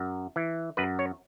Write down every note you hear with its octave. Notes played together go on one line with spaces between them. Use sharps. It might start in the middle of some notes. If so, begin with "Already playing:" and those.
Already playing: F#2
E3
F#2 B4
C#5